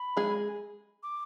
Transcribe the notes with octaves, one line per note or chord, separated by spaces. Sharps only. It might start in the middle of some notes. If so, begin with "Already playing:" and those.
Already playing: B5
G#3 G#4
D6